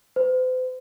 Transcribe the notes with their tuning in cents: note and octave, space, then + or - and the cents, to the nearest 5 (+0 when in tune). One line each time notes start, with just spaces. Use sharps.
C5 -45